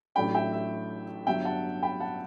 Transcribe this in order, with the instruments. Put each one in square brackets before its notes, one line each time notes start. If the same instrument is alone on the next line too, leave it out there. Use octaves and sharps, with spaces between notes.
[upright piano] A1 A2 F#3 A3 D4 G5 B5
E5 G5
E5
G1 G2 F#3 E5 G5
F#5 A5
G5 B5
F#5 A5